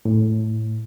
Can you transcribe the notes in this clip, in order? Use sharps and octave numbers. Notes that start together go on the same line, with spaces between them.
A2